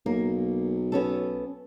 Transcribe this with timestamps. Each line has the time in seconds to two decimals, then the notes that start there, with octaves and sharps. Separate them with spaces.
0.06 B1 A#3
0.92 B3 C#4 A4